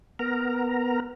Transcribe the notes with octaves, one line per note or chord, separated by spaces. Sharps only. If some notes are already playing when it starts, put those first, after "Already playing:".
B3 A#4 A#5